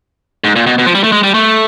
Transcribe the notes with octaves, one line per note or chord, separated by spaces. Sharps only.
G#2
A#2
B2
B2
F3
G3
A3
G#3
G3
A3